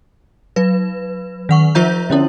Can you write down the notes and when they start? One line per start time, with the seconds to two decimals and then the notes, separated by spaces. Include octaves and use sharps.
0.56 F#3 B4
1.49 D#3 F#5 C#6
1.75 F3 F4 C5 E5 A#5 G6
2.10 D3 C#4 E4